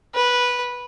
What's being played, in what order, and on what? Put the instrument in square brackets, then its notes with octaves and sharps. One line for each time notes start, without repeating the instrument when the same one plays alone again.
[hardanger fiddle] B4